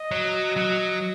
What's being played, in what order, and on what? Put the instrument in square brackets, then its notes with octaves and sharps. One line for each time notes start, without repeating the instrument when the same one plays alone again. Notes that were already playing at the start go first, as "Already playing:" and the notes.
Already playing: [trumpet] D#5
[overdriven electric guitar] F#3
F#3